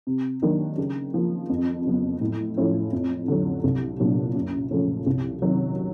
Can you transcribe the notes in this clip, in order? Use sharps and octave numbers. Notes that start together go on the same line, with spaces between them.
C3
D#3 F#3 A#3 D4
C#3
F3 A#3
F2
C#3 F#3 B3
A2
F3 A3 C#4 E4
F2
D3 F#3
C2
A#2 F#3 B3 D4
F#2
C#3 F3 A3 C#4
C2
C3 D#3 F#3